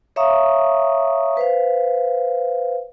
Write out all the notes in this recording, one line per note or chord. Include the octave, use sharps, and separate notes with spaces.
C#5 E5 F5 A#5 C#6 D#6
B4 C5 F5